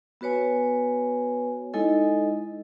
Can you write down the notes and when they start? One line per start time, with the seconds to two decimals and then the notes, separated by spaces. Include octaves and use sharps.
0.21 B3 F#4 B4 C#5 G#5
1.73 G#3 D#4 E4 A4 D#5 G#5